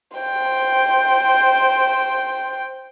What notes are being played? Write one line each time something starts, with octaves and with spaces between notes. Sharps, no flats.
C5 G5